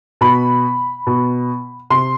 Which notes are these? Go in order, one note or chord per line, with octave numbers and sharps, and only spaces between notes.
B2 B5
B2
C3 C6